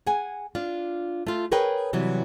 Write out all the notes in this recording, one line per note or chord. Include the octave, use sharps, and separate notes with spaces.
G#4 F#5 G#5
D4 F4
A3 F4
G#4 A#4 B4 C#5 G5
C3 E3 F#3 G3